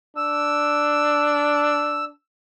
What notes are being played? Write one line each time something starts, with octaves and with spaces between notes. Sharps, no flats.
D4 E6